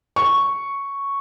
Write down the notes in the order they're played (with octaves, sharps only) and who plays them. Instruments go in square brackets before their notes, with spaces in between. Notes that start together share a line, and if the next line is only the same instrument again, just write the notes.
[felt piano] C#6